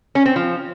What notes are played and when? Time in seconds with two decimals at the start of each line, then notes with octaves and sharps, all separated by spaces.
0.15 C#4
0.26 C4
0.36 F3